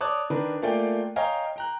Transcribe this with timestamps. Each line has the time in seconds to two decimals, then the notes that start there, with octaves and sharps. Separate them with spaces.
0.01 C#5 D5 A5 D6 D#6 F#6
0.30 D#3 D4 A#4 B4
0.62 A3 A#3 F4 D5 G5 G#5
1.16 C#5 D#5 F5 G5 G#5 A#5
1.56 G5 A#5 F#6